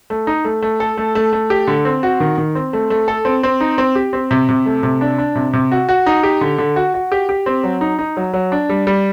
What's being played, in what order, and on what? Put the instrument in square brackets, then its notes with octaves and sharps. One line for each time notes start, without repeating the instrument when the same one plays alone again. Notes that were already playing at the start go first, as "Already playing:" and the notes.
[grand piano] A3
D#4
A3
A3
A4
A3
A3
A3
G4
D3
C4
F#4
D#3
D#3
C4
A3
A3
A4
C4
C4
D#4
C4
G4
C4
C3
C3
A3
C3
D4
D4
C3
C3
F#4
F#4
D#4
G4
D3
D3
F#4
F#4
G4
G4
C4
F#3
D#4
D#4
F#3
F#3
D4
G3
G3